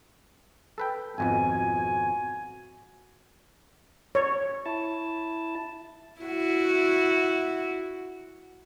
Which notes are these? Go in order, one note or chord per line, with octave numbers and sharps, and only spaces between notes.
A4 B4 G5
G#1 F2 B2 F#4 G#5
C#5
E4 A5
E4 F#4